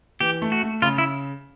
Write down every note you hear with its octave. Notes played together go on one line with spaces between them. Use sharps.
E3 G4
A3
F#4
A3
C#3 F4
E4